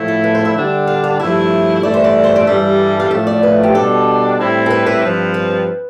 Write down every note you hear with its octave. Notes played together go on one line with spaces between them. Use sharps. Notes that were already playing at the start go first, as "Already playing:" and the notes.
Already playing: A2 F3 A3 E4
A4
B4
C5
E5
D3 G3 D4 G4
F5
F5
G2 F3 A3 E4 E5
G2 E3 A3 D5
C5
D5
C5
D5
G2 E3 G3 D4 A4 E5
F5
A2 F3 A3 E5
D5
B4
G4
B2 G3 D4 A4
A2 G3 C4 E4
A4
B4
B4
G2 F3 C4
B4